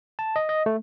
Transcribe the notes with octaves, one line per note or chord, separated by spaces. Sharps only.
A5
D#5
D#5
A3